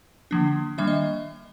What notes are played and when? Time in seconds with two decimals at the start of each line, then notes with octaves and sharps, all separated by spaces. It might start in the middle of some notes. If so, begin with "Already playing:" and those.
0.31 D3 F3 A#3 D4
0.78 D#3 G3 A#3 D4 E5
0.87 D#5